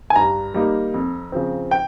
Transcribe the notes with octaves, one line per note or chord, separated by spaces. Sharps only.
G#5
G2 A#5
G3 A#3 D#4
F2
C#3 F3 C4
G5